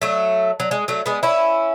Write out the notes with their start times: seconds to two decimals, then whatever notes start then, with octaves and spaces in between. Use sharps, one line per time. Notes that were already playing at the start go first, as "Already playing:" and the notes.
0.02 F#3 A3
0.60 F#3
0.71 G#3
0.88 F#3 A3
1.06 G#3 B3
1.23 C#4 E4